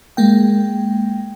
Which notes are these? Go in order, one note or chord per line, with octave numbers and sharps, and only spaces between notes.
G#3 A#3 G5